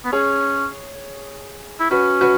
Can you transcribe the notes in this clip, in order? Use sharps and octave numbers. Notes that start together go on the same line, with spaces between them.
B3
C#4 G#4 C#5
E4
C#4 F#4 B4
F#4 B4